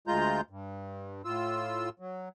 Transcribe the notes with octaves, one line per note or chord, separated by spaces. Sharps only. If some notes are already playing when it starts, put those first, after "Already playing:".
D2 G#3 F4 A#5 G6
G2
A2 F4 E6
F#3